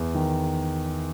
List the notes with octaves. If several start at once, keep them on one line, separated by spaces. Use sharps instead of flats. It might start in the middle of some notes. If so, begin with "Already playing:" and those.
Already playing: E2
D#3